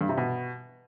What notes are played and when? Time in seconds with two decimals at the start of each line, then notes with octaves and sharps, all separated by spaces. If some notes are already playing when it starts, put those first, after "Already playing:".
0.01 G2
0.09 C3
0.17 B2